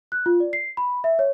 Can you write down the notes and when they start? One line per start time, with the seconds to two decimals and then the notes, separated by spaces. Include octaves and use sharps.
0.12 F#6
0.26 F4
0.40 D5
0.53 C7
0.77 B5
1.04 E5
1.19 C#5